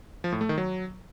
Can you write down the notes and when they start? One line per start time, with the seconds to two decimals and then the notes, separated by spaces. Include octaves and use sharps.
0.24 F3
0.32 A2
0.41 A3
0.49 D#3
0.58 F#3